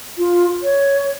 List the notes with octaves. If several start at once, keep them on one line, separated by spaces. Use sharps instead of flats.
F4
C#5